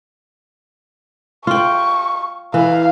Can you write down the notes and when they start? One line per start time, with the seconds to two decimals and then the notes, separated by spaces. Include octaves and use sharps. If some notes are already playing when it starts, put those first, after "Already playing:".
1.47 F4 G5 C#6
2.54 E3 F5